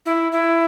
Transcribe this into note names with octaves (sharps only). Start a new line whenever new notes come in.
E4
E4